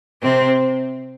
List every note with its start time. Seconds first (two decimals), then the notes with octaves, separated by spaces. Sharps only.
0.22 C3 C4